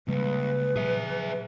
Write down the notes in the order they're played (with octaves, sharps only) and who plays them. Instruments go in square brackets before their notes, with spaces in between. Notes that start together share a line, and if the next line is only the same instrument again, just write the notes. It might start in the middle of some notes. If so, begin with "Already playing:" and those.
[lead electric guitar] C#2 [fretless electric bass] G3 A#3 [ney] B4
[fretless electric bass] A#2 F#3 [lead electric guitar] G#4 E5